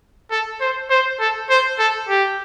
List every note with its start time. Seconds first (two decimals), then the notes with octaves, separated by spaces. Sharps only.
0.31 A4
0.61 C5
0.90 C5
1.20 A4
1.49 C5
1.79 A4
2.09 G4